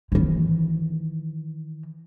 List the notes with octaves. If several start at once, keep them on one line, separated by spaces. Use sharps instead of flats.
D#3 E3